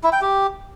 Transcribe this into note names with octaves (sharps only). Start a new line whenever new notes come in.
E4
G5
G4